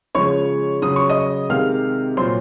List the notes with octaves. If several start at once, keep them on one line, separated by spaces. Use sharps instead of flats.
C#3 F3 G#3 C#5 C#6
C#3 F#3 D#6
C#6
D#5 D#6
C3 D#3 G#3 F5 F6
A#2 F#3 C5 C6